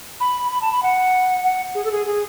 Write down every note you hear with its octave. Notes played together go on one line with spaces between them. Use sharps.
B5
B5
A5
B5
F#5
F#5
G#4
A4
G#4
G#4